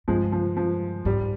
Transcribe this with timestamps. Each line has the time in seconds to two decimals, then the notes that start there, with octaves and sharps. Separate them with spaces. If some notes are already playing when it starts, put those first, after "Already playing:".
0.08 G2 F3 G#3
0.32 F3
0.57 F3
1.05 G#2 G3